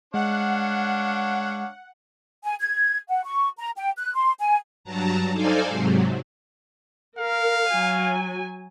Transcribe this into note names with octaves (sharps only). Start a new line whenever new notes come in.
G#3 D4 C#5 F5 F#5
G#5
G#6
F#5
C#6
A#5
G5
F#6
C6
G#5
G2 F#3 A5 A#5
D#4 A4 C5 D5 F5 G#5
G#2 C3 F#3
A#4 F5
F#3 G#5